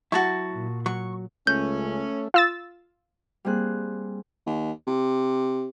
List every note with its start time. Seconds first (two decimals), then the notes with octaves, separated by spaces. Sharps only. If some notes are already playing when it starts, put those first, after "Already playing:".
0.12 F#3 E4 F#4 A5 C#6
0.51 A#2
0.86 F#3 C#6
1.47 C#2 A3 C#4 G6
2.34 F4 E6 A6
3.45 G3 A#3 C4 G#4 F#6
4.47 D#2
4.87 C3